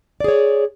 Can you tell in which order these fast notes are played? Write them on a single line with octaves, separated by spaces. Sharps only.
D5 G#4 C#5